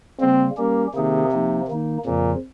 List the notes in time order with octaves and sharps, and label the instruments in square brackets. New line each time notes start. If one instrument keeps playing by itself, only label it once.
[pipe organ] C#3 G3 A#3 [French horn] C4
[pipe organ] G3 C#4 G4 [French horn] A#3
[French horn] C3 [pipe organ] D#3 A#3 D#4 G#4
[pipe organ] F3 A#3 D#4
D#3 A#3 D#4
[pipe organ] F2 C#3 F3 [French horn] A#2